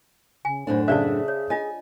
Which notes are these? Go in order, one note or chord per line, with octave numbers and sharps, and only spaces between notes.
C#3 G#5
F#2 A2 D4 C5
C#3 G#4 C5 D5 E5 A5
C#5
D4 F4 D#5 G#5